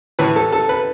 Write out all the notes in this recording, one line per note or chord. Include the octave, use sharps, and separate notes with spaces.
A2 E3 B4
A4
A4
B4